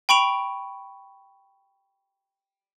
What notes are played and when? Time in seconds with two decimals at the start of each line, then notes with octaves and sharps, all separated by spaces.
0.09 G5 B5 C#6 D7 F7